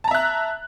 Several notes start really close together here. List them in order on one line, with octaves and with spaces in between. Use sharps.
A5 A#5 E5 F#6